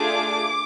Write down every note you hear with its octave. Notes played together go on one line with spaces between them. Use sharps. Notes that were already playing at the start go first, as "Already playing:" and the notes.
Already playing: A3 D4 F4 G#4 D6